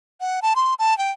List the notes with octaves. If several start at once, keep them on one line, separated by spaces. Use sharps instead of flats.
F#5
A5
C6
A5
G5